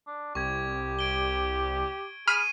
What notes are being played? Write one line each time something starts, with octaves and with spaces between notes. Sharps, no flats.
D4
C2 G4 C#6 G#6
G#6 D7 G7
G#4 B5 C#6 F6 C7 D#7